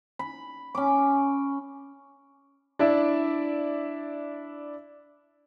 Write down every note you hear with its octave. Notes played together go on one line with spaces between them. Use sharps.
B5
C#4 D6
D4 E4 D5 E5